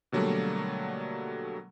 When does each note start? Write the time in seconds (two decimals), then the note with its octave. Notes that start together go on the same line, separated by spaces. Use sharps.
0.12 B2 D3 F#3 G3 A3 A#3